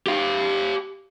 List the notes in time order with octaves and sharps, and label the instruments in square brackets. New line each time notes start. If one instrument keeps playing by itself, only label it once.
[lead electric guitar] G4 F5